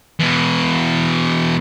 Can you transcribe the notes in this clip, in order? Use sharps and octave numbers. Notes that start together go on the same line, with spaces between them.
B2 E3